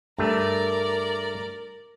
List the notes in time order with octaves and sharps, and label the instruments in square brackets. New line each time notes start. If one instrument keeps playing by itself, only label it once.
[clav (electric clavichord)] G2 A3 [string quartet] A#4 D5